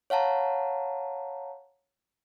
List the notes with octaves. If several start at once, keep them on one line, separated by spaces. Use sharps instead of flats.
C#5 F5 F#5 A5 A#5